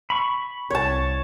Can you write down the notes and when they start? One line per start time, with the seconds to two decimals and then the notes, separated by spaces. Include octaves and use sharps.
0.10 B5 C#6
0.70 C2 C#5 A5